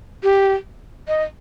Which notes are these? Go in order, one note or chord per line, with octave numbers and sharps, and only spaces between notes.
G4
D#5